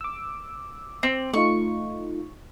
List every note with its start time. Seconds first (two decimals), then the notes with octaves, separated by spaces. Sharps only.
0.01 D6 E6
1.03 C4
1.34 A3 D#4 F4 C#6